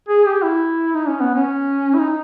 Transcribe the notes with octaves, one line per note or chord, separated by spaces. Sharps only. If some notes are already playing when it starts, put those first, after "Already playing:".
G#4
G4
E4
D#4
C#4
B3
C#4
E4
D#4